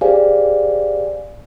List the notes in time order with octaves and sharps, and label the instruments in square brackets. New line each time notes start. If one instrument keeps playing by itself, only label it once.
[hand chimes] G4 G#4 C5 D5 F5 G#5